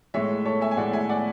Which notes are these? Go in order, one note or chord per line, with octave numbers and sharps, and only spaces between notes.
A2 G#3 C#5 E5
A4 C#5
E5 G#5
G#5
A2 G#3 D5 F#5
E5 G#5
D5 F#5